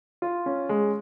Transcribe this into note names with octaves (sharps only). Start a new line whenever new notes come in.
F4
C#4
G#3